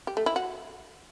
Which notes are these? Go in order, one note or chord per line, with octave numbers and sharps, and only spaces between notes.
G4
A3
E4
F#4